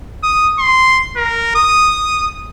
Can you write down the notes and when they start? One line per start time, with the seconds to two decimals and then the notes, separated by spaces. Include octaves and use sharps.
0.24 D#6
0.59 C6
1.16 A#4
1.56 D#6